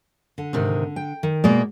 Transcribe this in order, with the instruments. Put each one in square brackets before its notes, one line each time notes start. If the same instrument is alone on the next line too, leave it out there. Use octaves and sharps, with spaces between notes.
[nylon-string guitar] D3
[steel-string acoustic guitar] G#2 C3 D#3
G5
[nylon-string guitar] D#3
[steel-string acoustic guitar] B2 G#3 [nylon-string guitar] A#3 A#4 D5